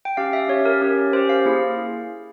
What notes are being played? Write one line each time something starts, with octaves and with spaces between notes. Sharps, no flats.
G5
C#4 G4 F5
E5
C#4 G4 C#5
A#4
C#4 G4
C#4 G4 C5
F5
A#3 E4 G#4